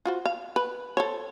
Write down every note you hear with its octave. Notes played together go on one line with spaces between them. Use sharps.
F4 F#4 C5
F5
B4
A4 C5 C#5